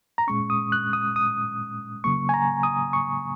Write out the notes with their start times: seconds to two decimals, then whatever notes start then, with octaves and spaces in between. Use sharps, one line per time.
0.18 A#5
0.27 A#2 G#3 C#4 C#6
0.50 D#6
0.72 F#6
0.93 D#6
1.16 D#6
2.04 C#3 F#3 A#3 C#6
2.29 G#5
2.34 A#5
2.63 D#6
2.93 C#6